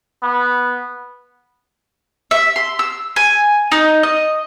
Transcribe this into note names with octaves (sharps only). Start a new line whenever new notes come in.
B3
E5
C6
E6
G#5
D#4
D#5